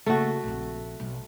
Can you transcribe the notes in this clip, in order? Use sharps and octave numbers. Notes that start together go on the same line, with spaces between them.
C#3 A3 A#3 F#4
A#1 C4
B1